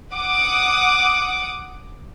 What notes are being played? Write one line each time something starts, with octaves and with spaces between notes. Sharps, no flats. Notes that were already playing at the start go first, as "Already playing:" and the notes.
F#5 D6 D#6